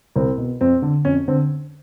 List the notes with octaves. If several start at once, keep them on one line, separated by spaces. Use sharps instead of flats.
C2 C4
B2
F2 C4
D3
F2 C#4
D3 C4